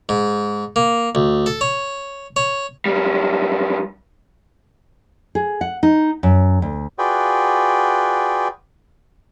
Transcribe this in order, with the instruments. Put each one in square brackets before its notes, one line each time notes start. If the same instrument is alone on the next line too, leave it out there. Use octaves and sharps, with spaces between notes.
[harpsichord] G#2
A#3
D2
A4
C#5
C#5
[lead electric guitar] F#2 G3
[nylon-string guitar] G#4
F#5
D#4
F#2
D2
[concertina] F4 F#4 G#4 B4 D5 G5